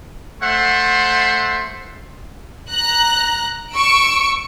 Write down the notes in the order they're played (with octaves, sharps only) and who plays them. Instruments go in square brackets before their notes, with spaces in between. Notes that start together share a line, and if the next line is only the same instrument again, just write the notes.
[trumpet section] A3 C5 E5 F#5 C6
[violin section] A#5 F#6
C#6 E6 D7